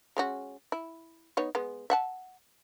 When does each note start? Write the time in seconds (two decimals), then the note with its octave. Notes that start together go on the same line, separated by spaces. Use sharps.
0.17 G#3 C#4 F#4
0.72 E4
1.37 B3 D#4 C#5
1.55 G#3 B3
1.90 E5 F#5 A5